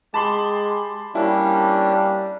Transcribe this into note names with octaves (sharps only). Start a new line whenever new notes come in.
G#3 G4 A5 B5 C6
G3 A#3 C#4 D4 E4